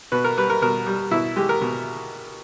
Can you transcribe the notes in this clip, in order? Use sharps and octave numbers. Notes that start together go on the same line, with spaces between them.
B2 B4
A#4
G3 B4
A#4
B2 A#4
G3
B2 E4
G#3 G4
A#4
B2